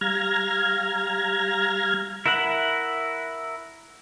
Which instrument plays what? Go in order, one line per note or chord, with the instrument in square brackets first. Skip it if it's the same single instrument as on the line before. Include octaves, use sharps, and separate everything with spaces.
[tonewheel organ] G3 F5 A#5 F6 G#6
[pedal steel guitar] E4 A#4 E5 F#5 B5